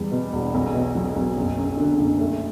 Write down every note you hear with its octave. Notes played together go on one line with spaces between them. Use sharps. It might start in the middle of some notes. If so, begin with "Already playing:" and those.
Already playing: E2 G3
B2
E1
B1
B2
F#3
B1
F#1
F#2
D3
F#1
A3